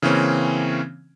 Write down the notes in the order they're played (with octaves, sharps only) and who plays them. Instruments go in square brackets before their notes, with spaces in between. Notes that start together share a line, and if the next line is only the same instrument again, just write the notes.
[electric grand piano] C#3 E3 A#3 C4 C#4